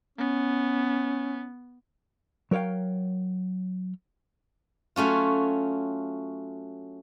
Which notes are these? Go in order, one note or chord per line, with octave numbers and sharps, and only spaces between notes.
B3 C#4
F#3 A#4 C#5 F5 G5
F#3 A3 C#4 F4